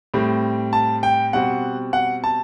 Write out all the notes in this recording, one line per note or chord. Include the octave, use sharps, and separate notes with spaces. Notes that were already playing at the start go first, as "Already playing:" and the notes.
A2 G3 C4
A5
G5
B2 G3 C4 F#5
F#5
A5